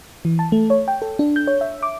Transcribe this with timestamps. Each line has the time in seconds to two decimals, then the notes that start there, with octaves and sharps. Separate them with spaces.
0.25 E3
0.39 A5
0.52 A3
0.70 C#5
0.88 G5
1.02 A4
1.19 D4
1.36 G6
1.47 C#5
1.61 E5
1.83 D6